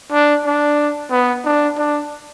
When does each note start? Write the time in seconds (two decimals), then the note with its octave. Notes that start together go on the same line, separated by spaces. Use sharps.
0.12 D4
0.45 D4
1.11 B3
1.45 D4
1.77 D4